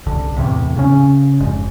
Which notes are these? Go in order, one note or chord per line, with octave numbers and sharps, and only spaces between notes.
C2 D3
E2 A2 C3
C#3 C#4
F1 G#2